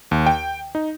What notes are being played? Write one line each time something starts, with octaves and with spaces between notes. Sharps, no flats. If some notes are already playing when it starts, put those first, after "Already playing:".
D#2
G5
D#4